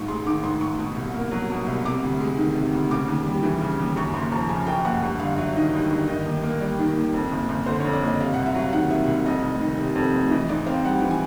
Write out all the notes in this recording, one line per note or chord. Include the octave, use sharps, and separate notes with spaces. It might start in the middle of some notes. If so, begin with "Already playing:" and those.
Already playing: A1 G#2 C#6
G#3 C6
D#3 D6
G#2 C6
A1 C#6
B2
C2
A#3
F#3
B2
C2
C3 D6
D2
G#3
D#3
C3
D2
C#3 D6
D#2
G3
E3
C#3
D#2
F#2 C#6
F#1 C6
F3 A#5
C#3 G#5
F#2 G5
F#1 F#5
G2 F#5
G1 F5
F#3 E5
D#3 D#5
G2
G1
D#3 D#5
D#2
A#3
G3 D5
D#3
D#2
F2
F#1
F#1
D3 C5
F2 C#5
D5
F#1 D#5
C3 F5
C2 F#5
E5
F#3 F5
D#3 F#5
C3 E5
C2
F2 D#5
F1
D#3
C3
F2
F1
E3 D#5
G#2 D5
C4 F5
G3 F#5
E3
G#5